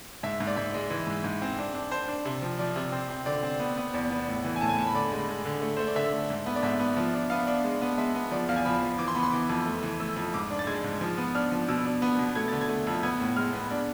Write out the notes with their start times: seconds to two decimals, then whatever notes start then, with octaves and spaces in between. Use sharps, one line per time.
0.23 G#2 E5
0.40 G#2
0.47 D5
0.56 G#2 E5
0.74 G#3
0.90 E3
1.07 G#2
1.24 G#2
1.42 C4
1.59 D4
1.75 D4
1.92 D4 C5
2.08 D4
2.25 C3
2.42 F3
2.59 F3 D5
2.76 C3
2.92 C4
3.10 C4
3.26 D3 D5
3.43 C4
3.60 B3
3.77 B3
3.94 E2 D5
4.10 B3
4.28 A2
4.44 E3
4.56 G#5
4.61 A2 A5
4.69 G#5
4.78 A2 A5
4.87 B5
4.94 D3 D5
5.12 G#3
5.28 G#3
5.45 D3
5.62 A3
5.77 A3 C5
5.87 D5
5.95 D3 E5
6.12 A3
6.30 G#2
6.46 B3
6.56 D5
6.63 G#2 E5
6.79 B3
6.97 F3
7.14 D4
7.30 B3 F5
7.47 D4
7.64 G#3
7.82 B3
7.98 G#3 E5
8.15 B3
8.31 F3 D5
8.48 E2 F5
8.56 G#5
8.65 F3 B5
8.82 F3
8.98 E3 D6
9.08 C6
9.15 B3 B5
9.23 C6
9.32 E3 D6
9.49 F2
9.66 A3
9.83 E3
10.00 A3 E6
10.16 F2
10.34 G#2 D6
10.50 D4
10.59 A6
10.67 G#3 G#6
10.84 G#2
11.01 F3
11.18 B3
11.35 D4 F6
11.51 F3
11.68 B2 E6
11.85 D4
12.02 B3
12.19 B2
12.35 A3 G#6
12.48 D3 A6
12.61 G#6
12.69 A3
12.87 F2
13.03 B3 G#6
13.20 A2
13.36 G#3 F6
13.53 B3
13.71 D4